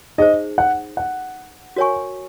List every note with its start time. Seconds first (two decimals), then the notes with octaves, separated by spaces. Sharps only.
0.18 D#4 G#4 C5 D#5
0.58 F#5
0.97 F#5
1.76 F#4 A#4 C#5 G#5 C#6